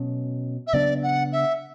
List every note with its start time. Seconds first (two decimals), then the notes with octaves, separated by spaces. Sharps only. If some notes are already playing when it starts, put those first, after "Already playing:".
Already playing: B2 F#3 C#4
0.66 E5
0.73 C#3 F#3 B3 D4 D5
1.02 F#5
1.32 E5